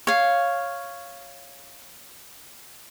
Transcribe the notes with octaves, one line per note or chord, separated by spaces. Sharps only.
C#5 F5